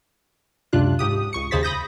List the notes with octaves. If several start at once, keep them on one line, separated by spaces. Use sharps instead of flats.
C#2 F#2 C3 D4 F4 F#6
G#2 G4 D#6
C#2 C#6 C#7
D#2 C#3 G#4 C5 A6 B6
B5 D#6 G6 A#6